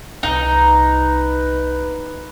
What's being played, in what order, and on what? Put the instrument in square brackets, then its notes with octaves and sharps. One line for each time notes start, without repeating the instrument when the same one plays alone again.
[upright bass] C2 [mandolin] D#4 [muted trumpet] B4